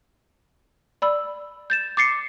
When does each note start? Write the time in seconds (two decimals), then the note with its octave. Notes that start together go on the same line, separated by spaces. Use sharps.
1.02 D5 B5 E6
1.70 G6 A6 E7
1.97 D6 A6 C7 C#7